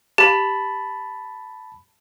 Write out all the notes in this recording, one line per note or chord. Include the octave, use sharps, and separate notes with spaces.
G4 A5 B5